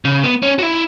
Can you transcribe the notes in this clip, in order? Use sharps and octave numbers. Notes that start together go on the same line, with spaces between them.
C#3
B3
C#4
F#4
E4